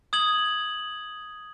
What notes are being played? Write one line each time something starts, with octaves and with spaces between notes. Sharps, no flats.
D#6 G#6 F#7